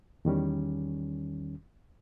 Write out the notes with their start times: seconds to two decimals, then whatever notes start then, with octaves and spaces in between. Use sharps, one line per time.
0.25 E2 D#3 G3 C#4